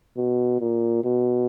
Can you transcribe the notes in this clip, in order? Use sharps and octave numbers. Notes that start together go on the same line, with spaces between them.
B2
A#2
B2